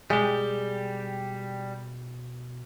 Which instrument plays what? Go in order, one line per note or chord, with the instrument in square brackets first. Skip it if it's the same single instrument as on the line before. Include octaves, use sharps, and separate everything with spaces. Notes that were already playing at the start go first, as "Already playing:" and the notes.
[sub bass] B2 [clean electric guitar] G3 G4 [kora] G#3